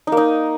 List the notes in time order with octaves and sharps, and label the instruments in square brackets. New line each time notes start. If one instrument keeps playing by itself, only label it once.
[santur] D#4
A#3
D#4